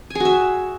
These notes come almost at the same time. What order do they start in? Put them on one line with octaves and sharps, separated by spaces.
G#5 G#4 F#4 E5